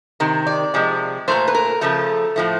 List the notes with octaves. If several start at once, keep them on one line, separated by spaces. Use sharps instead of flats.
C3 D#3
D5
C3 F3 G#3
A#2 F#3 A3 C5
B4
A#4
C#3 F3 A3 A4
A2 F3 A3